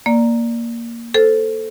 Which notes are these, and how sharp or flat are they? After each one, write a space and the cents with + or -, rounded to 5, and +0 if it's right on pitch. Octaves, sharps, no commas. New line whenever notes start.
A#3 +0 D5 +0
A4 +0 C5 +0